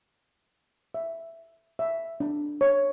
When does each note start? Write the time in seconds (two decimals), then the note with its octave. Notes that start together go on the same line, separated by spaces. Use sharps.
0.94 E5
1.79 E5
2.20 D4
2.61 C#5